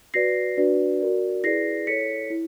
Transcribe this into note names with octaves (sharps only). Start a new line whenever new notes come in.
F#4 B4 D5 A#6 C7
D4 F#4 B4 D5
F#4 A#4 D5
E4 G#4 B4 D5 A#6 C7
E4 A4 C#5 B6 C#7
E4